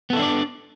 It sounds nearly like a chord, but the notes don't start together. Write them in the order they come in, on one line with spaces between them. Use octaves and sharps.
B3 A4 E4 D4 D5